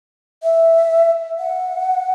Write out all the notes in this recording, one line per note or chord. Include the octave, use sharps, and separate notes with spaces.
E5
F#5